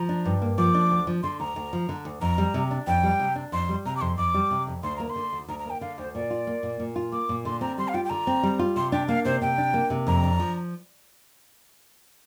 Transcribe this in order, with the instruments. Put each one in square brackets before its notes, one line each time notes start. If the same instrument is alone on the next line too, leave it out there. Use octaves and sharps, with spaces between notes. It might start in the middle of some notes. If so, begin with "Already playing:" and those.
Already playing: [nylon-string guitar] F3 [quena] A#5
[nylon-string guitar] D4
G2
A#3
[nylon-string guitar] F3 [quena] D6
[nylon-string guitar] D4
D2
F3
[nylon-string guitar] D3 [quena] C6
[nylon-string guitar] D2 [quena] A#5
[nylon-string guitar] D2
F3
D3
D2
[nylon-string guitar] F2 [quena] A#5
[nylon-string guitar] G3
C3
D4
[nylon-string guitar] F2 [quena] G5
[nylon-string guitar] G3
C3
D4
[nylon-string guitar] F2 [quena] C6
[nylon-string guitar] G3
[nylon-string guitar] C3 [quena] A#5
[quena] D6
[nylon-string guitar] F2 [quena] C6
[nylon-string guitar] F2 [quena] D6
[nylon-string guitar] G3
C3
F2
[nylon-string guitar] D2 [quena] C6
[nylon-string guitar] A#3 [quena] A#5
[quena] C6
[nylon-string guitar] D3
D2
[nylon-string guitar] D2 [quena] A#5
[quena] A#5
[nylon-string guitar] A#3 [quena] G5
[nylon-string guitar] D3 [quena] F5
[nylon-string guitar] D2 [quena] C5
[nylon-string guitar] A#2 [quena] D5
[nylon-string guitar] F4
A#3
A#2
A#2
F4
[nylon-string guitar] A#3 [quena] D6
[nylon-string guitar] A#2
[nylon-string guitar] D3 [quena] C6
[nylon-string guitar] C4 [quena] A#5
[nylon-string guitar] G3 [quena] C6
[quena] F5
[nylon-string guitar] F4 [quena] G5
[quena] G5
[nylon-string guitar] D3 [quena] A#5
[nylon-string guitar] C4
G3
F4
[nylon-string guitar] C3 [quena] C6
[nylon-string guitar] D4 [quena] G5
[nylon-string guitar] A#3 [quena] F5
[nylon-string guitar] C3 [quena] C5
[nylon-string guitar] C3 [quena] G5
[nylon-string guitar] D4
A#3
C3
[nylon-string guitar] F2 [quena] A#5
[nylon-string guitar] D4
F3